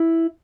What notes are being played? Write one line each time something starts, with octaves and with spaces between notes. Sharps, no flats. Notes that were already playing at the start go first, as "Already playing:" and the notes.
Already playing: E4